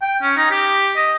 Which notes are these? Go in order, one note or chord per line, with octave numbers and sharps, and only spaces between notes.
G5
C#4
D#4
G4
D#5